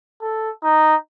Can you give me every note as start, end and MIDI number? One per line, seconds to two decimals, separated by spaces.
0.22 0.49 69
0.63 0.95 63